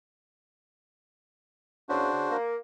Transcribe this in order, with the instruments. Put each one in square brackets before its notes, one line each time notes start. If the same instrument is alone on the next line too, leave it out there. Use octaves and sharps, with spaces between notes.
[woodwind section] E2 C#3 [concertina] D4 F#4 C5
[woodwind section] C#3
A#3